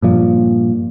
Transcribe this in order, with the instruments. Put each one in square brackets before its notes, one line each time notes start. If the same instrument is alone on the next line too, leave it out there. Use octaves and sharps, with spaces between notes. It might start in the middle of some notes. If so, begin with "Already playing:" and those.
[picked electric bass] G2 A#2 F3